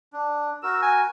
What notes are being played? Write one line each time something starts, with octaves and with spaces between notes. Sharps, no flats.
D4
F#4 A#4 E6
G#5